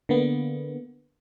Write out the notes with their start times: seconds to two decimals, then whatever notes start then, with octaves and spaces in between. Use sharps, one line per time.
0.09 D3 A#3 B3